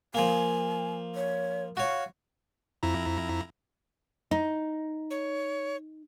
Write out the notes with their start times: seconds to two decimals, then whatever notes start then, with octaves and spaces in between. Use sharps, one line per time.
0.15 F3 A#3 G#5
1.15 C#5
1.77 F#4 C#5 F5
2.83 F2 E4 A#5
4.31 D#4
5.10 C#5